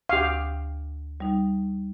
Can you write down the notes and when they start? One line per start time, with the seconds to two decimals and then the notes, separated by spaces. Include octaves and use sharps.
0.09 D2 G4 F5
1.20 G3 D#4